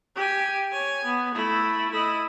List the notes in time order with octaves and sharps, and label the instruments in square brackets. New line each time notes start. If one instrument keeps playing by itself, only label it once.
[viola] G4 G#5
C#5 G#5
B3
A3 E4
E4 D#5